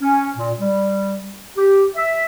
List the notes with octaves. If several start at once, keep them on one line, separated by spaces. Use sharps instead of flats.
C#4
A#2
G3
G4
E5